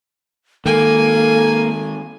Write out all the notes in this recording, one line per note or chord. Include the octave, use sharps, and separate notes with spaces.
D#3 G#3 A#3 A4 G#5